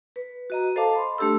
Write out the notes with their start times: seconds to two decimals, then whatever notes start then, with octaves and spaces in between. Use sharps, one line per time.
0.16 B4
0.50 F#4 D#5 A#5
0.76 A4 C5 D#5 F5 A5 D6
0.95 B5 C6
1.18 A3 D4 G4 A4 E6